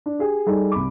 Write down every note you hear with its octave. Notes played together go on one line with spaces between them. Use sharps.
D4
G4 G#4
G3 D#4 G#4 A4
C2 B5 D6